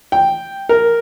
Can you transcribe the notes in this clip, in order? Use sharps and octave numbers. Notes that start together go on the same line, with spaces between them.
G5
A#4